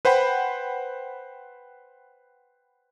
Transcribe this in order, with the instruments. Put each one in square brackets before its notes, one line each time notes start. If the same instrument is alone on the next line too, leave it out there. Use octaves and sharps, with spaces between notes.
[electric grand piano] B4 C5 F#5 G5 B5